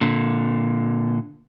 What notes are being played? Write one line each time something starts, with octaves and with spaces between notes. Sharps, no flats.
A#2 D3